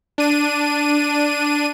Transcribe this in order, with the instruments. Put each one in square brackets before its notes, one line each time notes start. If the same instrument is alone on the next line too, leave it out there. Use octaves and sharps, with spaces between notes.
[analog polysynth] D4 D#7